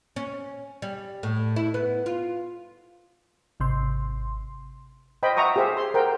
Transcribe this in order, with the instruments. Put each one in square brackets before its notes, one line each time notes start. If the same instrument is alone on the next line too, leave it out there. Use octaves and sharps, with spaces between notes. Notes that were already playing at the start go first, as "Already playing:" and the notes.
[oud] C#4
G3
A2
E4
B3
F4
[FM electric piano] G#1 C3 C6
[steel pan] C5 D#5 G5 B5
E5 F#5 A#5 C#6 D#6
G4 G#4 C5 E5 F5
C6
A#4 C5 F#5 G5